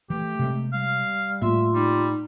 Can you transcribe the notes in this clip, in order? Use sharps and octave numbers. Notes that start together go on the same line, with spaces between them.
E3 A3 G4
C3 G#3
G3 F5
A2 A3 A#3 F4 E5 C6
G3 D#4